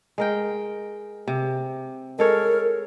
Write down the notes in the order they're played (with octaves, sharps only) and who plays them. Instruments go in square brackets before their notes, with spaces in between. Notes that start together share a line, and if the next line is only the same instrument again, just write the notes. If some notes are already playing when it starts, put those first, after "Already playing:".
[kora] G#3 A#4 G5
C3
[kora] G#3 A4 C#5 [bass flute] A#4